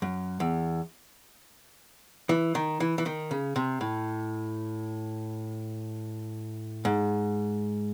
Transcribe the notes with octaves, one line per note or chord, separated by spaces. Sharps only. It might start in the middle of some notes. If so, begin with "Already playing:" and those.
F#2
E2
E3
D#3
E3
E3
D#3
C#3
C3
A2
G#2